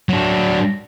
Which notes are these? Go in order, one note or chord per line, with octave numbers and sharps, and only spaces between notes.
F#3 D4